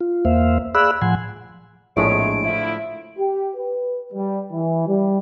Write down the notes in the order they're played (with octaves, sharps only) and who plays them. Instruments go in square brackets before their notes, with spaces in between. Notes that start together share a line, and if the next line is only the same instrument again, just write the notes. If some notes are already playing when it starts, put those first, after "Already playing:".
[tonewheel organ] F4
E2 A#3 C5 E5 F5
G#4 D5 F5 B5 E6 F#6
A2 F3 F#5 G#5 C6
[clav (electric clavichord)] A#1 G#3 [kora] A2 A3 [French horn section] C4 G#4 C#5 [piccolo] D7
[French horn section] D3 F3 E4
[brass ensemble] G4
B4
G3
E3
G3